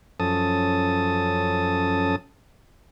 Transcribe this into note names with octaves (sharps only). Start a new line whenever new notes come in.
F#2 F3 C#4 A4 A5 D#6